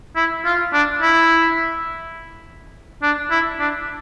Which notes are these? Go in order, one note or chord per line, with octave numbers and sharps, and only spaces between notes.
E4
F4
D4
E4
D4
E4
D4